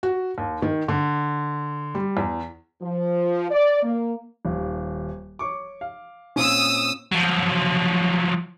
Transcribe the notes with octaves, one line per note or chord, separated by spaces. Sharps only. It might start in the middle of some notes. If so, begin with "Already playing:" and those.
F#4
D#2
D#3
D3
G3
E2
F3
D5
A#3
D#1 D#2
C#5 C#6 D6
F5
A#2 C4 C#4 D#6 E6
F3 F#3